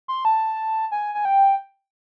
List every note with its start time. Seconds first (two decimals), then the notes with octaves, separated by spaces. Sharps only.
0.08 C6
0.25 A5
0.92 G#5
1.15 G#5
1.25 G5